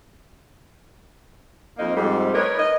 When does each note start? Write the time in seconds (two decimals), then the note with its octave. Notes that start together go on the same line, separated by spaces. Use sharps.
1.78 F2 A#3 D#4
1.96 F2 G#2 G3 A3
2.34 D#4 A#4 B4 C#5
2.58 D#5